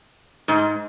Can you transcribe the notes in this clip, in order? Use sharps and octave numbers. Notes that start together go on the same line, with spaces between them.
G#2